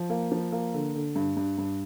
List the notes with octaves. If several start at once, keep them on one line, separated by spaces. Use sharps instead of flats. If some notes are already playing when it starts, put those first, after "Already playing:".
Already playing: F3
A#3
F3
A#3
D3
D3
G2
G2
G2